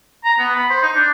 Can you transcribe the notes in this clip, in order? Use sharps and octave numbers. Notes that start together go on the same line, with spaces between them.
A#5
B3
B5
C5
D#4
D4